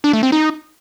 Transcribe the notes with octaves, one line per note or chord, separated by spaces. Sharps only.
D4
A3
C4
D#4